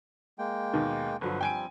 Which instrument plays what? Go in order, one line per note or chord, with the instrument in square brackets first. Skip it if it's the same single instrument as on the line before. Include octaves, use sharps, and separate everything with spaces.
[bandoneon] G#3 A#3 G5
[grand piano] D#2 B2 D#3
[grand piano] G1 F#3 [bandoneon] D3 F3 B4
[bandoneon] F3 G3 C4 [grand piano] G5 G#5 D7